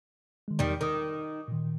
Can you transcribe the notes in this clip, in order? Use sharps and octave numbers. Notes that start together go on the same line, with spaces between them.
D#3 G#3
E2 D#3 G3 D5
D#3 D6 D#6
A#2 D#3